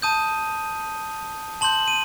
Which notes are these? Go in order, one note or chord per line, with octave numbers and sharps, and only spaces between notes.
A5 D#6 G6 D#7
A5 C6 G6 F#7
D#7